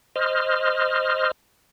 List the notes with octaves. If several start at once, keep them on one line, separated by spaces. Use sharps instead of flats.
C5 D#5 F6